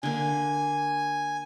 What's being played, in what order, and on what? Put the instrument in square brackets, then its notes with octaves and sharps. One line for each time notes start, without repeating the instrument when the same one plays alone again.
[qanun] D3 A#3 [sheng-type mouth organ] G#5